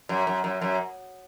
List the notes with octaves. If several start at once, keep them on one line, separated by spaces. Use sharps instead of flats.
F#2
F#2
F#2
F#2